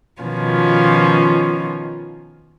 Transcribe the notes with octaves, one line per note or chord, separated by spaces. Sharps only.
B2 D#3 F3 C#4 F4